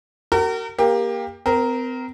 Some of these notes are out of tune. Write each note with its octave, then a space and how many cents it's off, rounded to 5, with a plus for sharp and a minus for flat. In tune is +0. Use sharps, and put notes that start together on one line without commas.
F#4 +40 A#4 -30
A#3 +10 G4 +20
C4 -40 A#4 +0